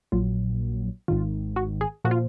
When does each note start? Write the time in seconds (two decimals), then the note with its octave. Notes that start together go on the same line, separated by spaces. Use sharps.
0.12 A#1 A#2 F#3 F4
1.08 G#1 G#2 D#3 F4
1.56 F#4
1.81 G#4
2.04 A#2 F3 F#4
2.11 F4